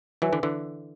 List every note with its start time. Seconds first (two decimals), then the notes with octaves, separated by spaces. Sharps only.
0.22 E3 F#3 B4 E5 G#5
0.33 D3 E3
0.43 D3 E3